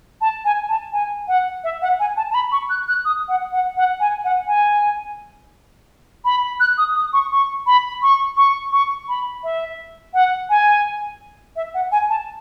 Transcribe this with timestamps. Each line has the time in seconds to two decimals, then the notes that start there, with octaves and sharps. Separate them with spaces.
0.21 A5
0.45 G#5
0.69 A5
0.93 G#5
1.28 F#5
1.64 E5
1.82 F#5
2.00 G#5
2.17 A5
2.31 A5
2.34 B5
2.52 C#6
2.70 F#6
2.88 F#6
3.05 D#6
3.28 F#5
3.52 F#5
3.77 F#5
4.00 G#5
4.24 F#5
4.47 G#5
6.25 B5
6.60 F#6
6.78 D#6
6.96 D#6
7.13 C#6
7.31 C#6
7.67 B5
8.02 C#6
8.37 C#6
8.72 C#6
9.09 B5
9.44 E5
10.14 F#5
10.50 G#5
11.56 E5
11.74 F#5
11.92 G#5
12.10 A5